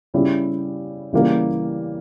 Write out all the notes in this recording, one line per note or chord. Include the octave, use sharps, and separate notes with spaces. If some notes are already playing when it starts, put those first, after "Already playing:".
C#3 G3 C#4 E4
C#3 E3 G3 A#3